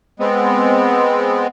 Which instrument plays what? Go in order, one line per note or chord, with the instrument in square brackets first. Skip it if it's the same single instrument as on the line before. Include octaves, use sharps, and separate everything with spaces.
[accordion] G#3 B3 C4